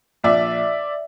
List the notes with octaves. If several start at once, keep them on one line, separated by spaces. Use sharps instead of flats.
A#1 D5 E5